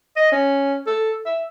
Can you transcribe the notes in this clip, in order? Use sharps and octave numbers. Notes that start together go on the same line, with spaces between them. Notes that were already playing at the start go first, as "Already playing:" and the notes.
D#5
C#4
A4
E5